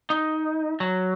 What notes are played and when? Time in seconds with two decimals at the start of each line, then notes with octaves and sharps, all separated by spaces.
0.10 D#4
0.80 F#3